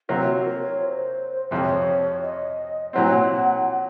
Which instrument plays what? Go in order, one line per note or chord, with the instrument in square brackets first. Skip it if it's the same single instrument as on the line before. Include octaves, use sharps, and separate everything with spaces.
[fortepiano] C3 F#3 A#3 [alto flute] F4
[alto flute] F#4
A#4
C#5
C5
[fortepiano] F2 C3 F3 [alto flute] C#5
[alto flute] D#5
[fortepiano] A#2 F#3 C4 [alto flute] F#5